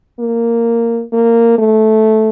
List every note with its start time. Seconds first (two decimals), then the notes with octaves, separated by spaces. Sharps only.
0.19 A#3
1.13 A#3
1.58 A3